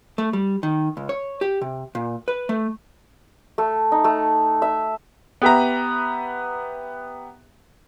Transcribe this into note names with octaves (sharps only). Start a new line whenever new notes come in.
A3
G3
D#3
C#2
C#5
G4
C3
A#2
B4
A3
A3
D#4
A3
E5
B3 G4 B4 E5 A#5